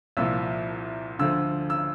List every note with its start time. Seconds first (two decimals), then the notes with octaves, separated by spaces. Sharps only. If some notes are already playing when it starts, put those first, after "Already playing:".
0.17 C2 A#2 F3 E6
1.19 D2 D3 F3 E6
1.70 E6